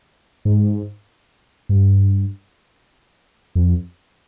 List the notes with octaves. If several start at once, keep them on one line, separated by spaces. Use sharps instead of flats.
G#2
G2
F2